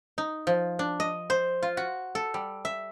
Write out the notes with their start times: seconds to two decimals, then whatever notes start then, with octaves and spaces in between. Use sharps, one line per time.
0.18 D#4
0.47 F3
0.79 D4
1.00 D#5
1.30 C5
1.63 F4
1.77 F#4
2.15 A4
2.34 G3
2.65 E5